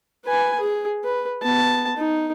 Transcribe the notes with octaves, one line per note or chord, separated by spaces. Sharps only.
B4 G#5
G#4
B4
B3 A5
D#4